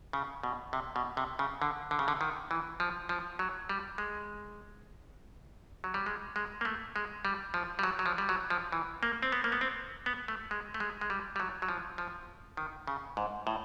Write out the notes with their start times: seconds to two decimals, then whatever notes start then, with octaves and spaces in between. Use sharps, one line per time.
0.13 C#3
0.43 B2
0.73 C3
0.96 B2
1.17 C3
1.39 C#3
1.62 D3
1.91 D3
1.99 C#3
2.08 D3
2.21 D#3
2.51 E3
2.80 F3
3.09 F3
3.39 F#3
3.69 G3
3.98 G#3
5.84 F#3
5.94 G3
6.06 G#3
6.36 G#3
6.61 A#3
6.65 A3
6.96 G#3
7.25 G3
7.54 F3
7.79 G3
7.83 F#3
7.99 F#3
8.06 F3
8.18 G3
8.29 F#3
8.50 F3
8.72 E3
9.03 A#3
9.23 C4
9.32 B3
9.44 A#3
9.52 B3
9.61 C4
10.06 B3
10.28 A3
10.51 G#3
10.74 A3
10.80 G#3
11.01 G#3
11.10 G3
11.36 G3
11.40 F#3
11.62 F#3
11.69 F3
11.98 F3
12.57 D#3
12.87 C#3
13.17 G#2
13.47 A2